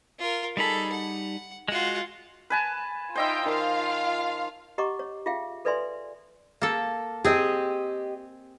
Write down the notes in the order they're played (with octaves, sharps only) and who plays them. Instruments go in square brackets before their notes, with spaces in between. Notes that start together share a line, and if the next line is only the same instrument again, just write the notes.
[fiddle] F4 A#4
[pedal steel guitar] G3 D#4 B5 [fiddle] G#4 A4
[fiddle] F#5
[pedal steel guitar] G#3 F#4 [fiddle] F4 F#5
[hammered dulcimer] B4 G#5 A5
[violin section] D#4 F4 G5 [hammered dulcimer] C5 D#5 E5
[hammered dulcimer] D#3 A5 C6 [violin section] F4 F5
[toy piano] G4 D#5 F#5 A#5 C#6 D6
C#5
F4 G#4 E5 F5 G5
A4 B4 D5 E5 G#5 C6
[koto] A#3 A4
[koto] C4 G#4 [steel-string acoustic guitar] G4 D#5